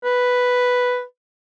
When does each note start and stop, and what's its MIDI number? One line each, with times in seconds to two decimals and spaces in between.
0.04 1.03 71